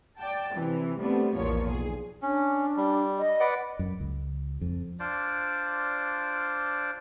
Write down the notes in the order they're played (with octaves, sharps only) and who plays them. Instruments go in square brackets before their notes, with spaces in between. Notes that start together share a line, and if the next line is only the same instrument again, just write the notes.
[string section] D5 G5 A5
C3 E3
G3 A3 B3 C4 D4
A#1 E2 A#2 F3 C#5
B1 G#4
[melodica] C#4 [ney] D4
[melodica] G3
[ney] D#5
[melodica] B4 D5 F#5
[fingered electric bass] F#2
C#2
F2
[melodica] D4 F4 C5 D5